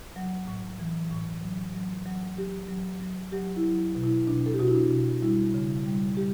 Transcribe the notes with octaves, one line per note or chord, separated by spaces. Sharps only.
F#3
A2
E3
A2
F#3
F#3
F#3
F#3 G4
F#3
F#3
F#3 G4
E4
F#3
B2
E4
B2 D4
A4
G4
B2 F#4
E4
D4
B2
G3 E4
C#3
G3
G3 G4